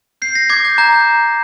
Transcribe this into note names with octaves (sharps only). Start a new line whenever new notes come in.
G6 C7
A#6
D6 G#6
G6
A#5 G6